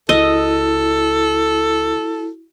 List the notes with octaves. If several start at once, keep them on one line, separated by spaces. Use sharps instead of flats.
C#2 E4 F#4 A4 D#5